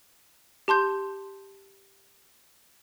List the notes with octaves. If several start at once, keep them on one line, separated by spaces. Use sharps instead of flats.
G4 A5 C6 G6